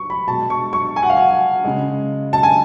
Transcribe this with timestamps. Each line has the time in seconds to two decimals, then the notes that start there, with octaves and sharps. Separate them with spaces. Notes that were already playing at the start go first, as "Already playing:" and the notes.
Already playing: C#6
0.10 B5
0.28 B2 G#3 A5
0.50 C#6
0.73 C#6
0.96 G#5
1.03 F#5
1.10 F5
1.17 F#5
1.65 C#3 G#3
2.33 A5
2.43 G#5